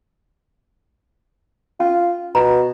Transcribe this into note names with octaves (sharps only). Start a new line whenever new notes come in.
C#4 F4
B2 A#5